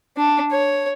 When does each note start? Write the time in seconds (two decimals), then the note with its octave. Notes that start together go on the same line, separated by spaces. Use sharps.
0.17 D4
0.51 C#5